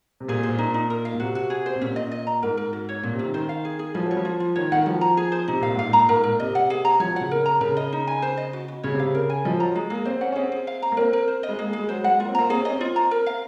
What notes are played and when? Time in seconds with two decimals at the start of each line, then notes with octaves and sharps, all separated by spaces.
0.20 C3
0.28 A#2 G#4
0.43 C5
0.49 A#2
0.58 D#4
0.74 D#4
0.90 A#4
1.05 F5
1.15 A#2
1.20 C3 F#4
1.35 F#4
1.50 G#4
1.66 C5
1.76 C3
1.81 A#2 C#4
1.96 D#5
2.12 D#5
2.27 A#5
2.43 G#2 A#4
2.57 A#4
2.73 F#4
2.89 C#5
3.03 A#2 C#4
3.13 C3
3.19 D#3 C#4
3.34 D#3 C5
3.49 F5
3.65 G#4
3.79 G#4
3.95 F3 G#4
4.06 F#3
4.11 C#5
4.17 F3
4.25 F4
4.40 F4
4.56 D#3 C#5
4.72 D#3 F#5
4.86 F3 F#4
5.01 A#5
5.17 G#4
5.32 C5
5.48 C3 D#4
5.61 A#2 F5
5.75 G#2 F5
5.88 A#2
5.93 A#5
6.09 G#2 A#4
6.24 A#2 A#4
6.39 C3 D#5
6.55 F#5
6.70 G#4
6.85 A#5
7.00 F3 C#5
7.10 F#3
7.16 C#3 F#5
7.31 A#4
7.46 A#5
7.61 C#3 A#4
7.77 D#5
7.93 D#4
8.07 G#5
8.22 C5
8.37 D#5
8.53 F#4
8.68 F#4
8.84 C#3 C#5
8.94 C3 F5
9.06 C#3
9.15 A#4
9.30 G#5
9.45 F3 D#5
9.59 F#3 A#5
9.75 G#3 G#4
9.90 A#3 G#4
10.05 C4 C5
10.21 C#4 F#5
10.32 C#4
10.36 C4 G#4
10.52 G#4
10.67 F5
10.82 A#5
10.92 A#3
10.97 C4 A#4
11.13 A#4
11.28 C5
11.43 D#5
11.49 G#3
11.59 A#3 G#4
11.69 G#3
11.73 G#4
11.79 G#3
11.89 F#3 C5
12.04 G#3 F#5
12.20 A#3 F4
12.29 C4
12.35 A#3 A#5
12.50 C4 G#4
12.60 C#4
12.65 D#5
12.70 C4
12.81 C4 F4
12.96 A#5
13.11 A#4
13.26 F5